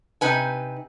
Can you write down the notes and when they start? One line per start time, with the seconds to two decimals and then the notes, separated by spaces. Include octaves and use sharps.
0.21 C3 D#4 B4 G#5